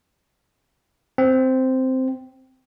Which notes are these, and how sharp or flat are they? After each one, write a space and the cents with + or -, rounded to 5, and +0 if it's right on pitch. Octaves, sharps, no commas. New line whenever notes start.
C4 -5